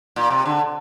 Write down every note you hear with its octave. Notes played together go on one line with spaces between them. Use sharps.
A#2
C3
D3